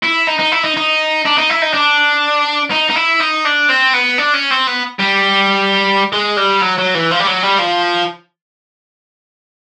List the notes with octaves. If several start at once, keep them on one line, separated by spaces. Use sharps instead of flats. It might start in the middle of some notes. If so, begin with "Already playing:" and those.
E4
D#4
D#4
E4
D#4
D#4
D4
D#4
E4
D#4
D4
D#4
D#4
E4
D#4
D4
C4
B3
D4
C#4
C4
B3
G3
G#3
G3
F#3
F#3
E3
F3
G3
F#3
G3
F3